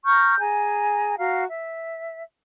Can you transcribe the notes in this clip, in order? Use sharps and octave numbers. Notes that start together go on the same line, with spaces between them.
A#5 C#6 F6 G6
G#4 G#5 A#5
F#4 F5 A#5
E5